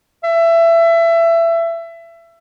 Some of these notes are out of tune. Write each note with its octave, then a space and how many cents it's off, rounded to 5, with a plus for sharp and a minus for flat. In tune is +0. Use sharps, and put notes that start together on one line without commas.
E5 +20